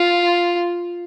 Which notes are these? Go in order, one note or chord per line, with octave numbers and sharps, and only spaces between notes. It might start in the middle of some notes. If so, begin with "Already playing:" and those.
Already playing: F4